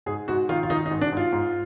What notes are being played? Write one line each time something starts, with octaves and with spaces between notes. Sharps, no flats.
G#2 G#4
G#2 F#4
D#3 F4
F4
D#3 D#4
D#4
G#2
D4
G#2 F4
G#2